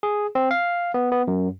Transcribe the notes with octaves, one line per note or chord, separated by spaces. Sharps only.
G#4
C4
F5
B3
B3
F#2